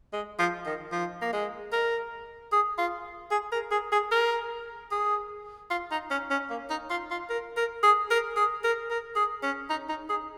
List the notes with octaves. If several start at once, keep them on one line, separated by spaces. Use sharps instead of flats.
G#3
F3
D#3
F3
A#3
G#3
A#4
G#4
F4
G#4
A#4
G#4
G#4
A#4
G#4
F4
D#4
C#4
C#4
A#3
D#4
F4
F4
A#4
A#4
G#4
A#4
G#4
A#4
A#4
G#4
C#4
D#4
D#4
G#4